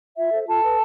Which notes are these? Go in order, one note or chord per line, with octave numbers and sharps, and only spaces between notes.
F4 E5
A4 C5
F4 A4 A5
B4